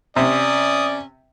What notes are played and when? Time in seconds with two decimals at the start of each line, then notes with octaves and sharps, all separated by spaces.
0.16 C3 C#4 D5 D#6